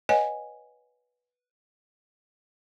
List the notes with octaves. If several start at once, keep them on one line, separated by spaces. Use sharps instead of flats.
B4 C#5 D#5 F#5 G#5